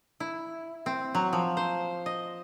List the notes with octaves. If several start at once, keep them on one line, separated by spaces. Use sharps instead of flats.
E4
C4
F#3
F3
C5
D#5